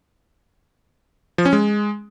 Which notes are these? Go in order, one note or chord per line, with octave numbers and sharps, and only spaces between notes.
F3
C#4
G#3